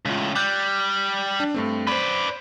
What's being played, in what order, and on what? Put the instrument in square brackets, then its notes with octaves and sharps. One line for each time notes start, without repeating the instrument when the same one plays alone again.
[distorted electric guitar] A2 C#3 [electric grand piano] G#3 F4
[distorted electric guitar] G3 [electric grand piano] D6 F#6 G6
[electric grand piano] D4
G2 A3 C4
[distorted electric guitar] B4 D5 [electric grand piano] C5 B5